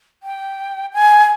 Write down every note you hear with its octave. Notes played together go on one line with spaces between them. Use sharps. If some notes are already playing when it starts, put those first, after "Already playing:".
G5
G#5